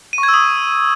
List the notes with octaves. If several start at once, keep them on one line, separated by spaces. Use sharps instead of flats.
D#7
C#6
G#6
E6
D#6